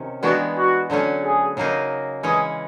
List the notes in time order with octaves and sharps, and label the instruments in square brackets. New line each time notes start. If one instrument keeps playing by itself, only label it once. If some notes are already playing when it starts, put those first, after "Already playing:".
Already playing: [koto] C3 D#3 C#4
[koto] E3 G#3 B3 D4 G4 [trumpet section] F#4
[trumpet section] F#4
[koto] D3 F#3 A3 C#4
[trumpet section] G#4
[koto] C#3 F#3 A#3 D#4
[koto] E3 G#3 C#4 [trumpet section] G#4